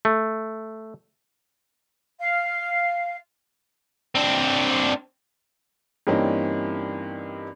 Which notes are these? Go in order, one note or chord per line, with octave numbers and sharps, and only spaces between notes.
A3
F5
C4 D4
G2 E3 A#3 C4 C#4 D#4